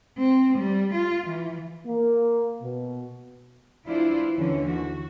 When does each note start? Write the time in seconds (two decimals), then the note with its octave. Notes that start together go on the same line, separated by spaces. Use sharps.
0.18 C4
0.58 G3
0.94 F4
1.27 E3
1.86 A#3
2.62 B2
3.87 E3 D4 E4 F4 C5
4.37 D#2 D3 E3 C#4
4.67 F#4